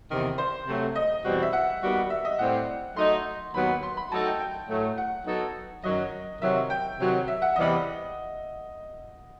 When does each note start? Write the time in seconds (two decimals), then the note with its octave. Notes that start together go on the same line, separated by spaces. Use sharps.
0.09 E2 C3 D#3
0.38 C5
0.67 C3 F#3 A3
0.96 D#5
1.24 E2 B2 G3 C4 F#4
1.42 E5
1.53 F#5
1.82 D#2 D#3 G3 B3 F#4
2.10 E5
2.25 D#5
2.39 A2 G3 C4 F#5
2.96 F#3 A3 D#4 C6
3.54 D#2 D#3 F#3 B3 B5
3.83 C6
3.97 B5
4.11 F#3 A3 D#4 A4 A5
4.25 G5
4.40 G5
4.69 A2 F#3 A3
4.98 F#5
5.26 F#3 B3 D#4 A4
5.84 F#2 D#3 F#3 D#5
6.41 C3 D#3 F#3 E5
6.70 G5
6.99 C3 D#3 F#3
7.28 E5
7.42 F#5
7.56 E2 C3 E3 G3 B3 D#5